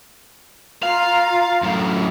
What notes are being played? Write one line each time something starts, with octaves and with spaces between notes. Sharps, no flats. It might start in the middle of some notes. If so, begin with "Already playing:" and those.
F4 F5 A#5
F#2 A2